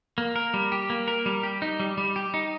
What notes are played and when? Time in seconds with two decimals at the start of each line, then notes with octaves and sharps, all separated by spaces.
0.18 A#3
0.36 A#4
0.54 G3
0.72 G4
0.90 A#3
1.08 A#4
1.26 G3
1.43 G4
1.62 D#4
1.80 G3
1.98 G3
2.16 G4
2.34 D#4